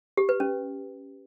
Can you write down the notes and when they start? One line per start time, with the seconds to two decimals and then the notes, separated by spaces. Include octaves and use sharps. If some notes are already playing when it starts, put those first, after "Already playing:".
0.17 G4
0.29 B4
0.40 C#4